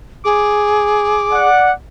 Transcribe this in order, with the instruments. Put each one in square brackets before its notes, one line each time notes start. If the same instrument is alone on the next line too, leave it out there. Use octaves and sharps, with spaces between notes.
[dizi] G#4 [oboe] D6
[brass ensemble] D5 F#5